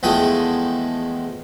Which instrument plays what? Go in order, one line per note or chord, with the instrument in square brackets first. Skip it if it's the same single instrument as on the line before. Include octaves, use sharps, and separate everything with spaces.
[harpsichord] E2 F3 G#3 A3 G5 D#6